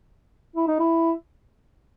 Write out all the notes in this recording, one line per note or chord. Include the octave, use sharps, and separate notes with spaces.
E4
D#4
E4